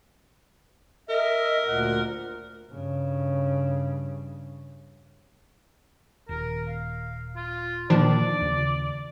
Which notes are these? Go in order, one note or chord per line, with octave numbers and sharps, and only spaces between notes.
A#4 D#5 E5
D2 A#2 F#5
G2 C#3
D#1 A#4
F5
F4
A#2 D3 D#3 F3 A#3 D4 D5
D#2 C#3